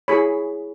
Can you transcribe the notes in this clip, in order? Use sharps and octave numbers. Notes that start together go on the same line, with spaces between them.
E4 G#4 C#5 B5